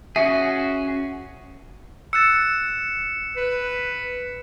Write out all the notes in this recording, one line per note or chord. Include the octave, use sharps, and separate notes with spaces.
C#4 F#4 G#4 E5
E6 F#6 A6 C#7 E7
B4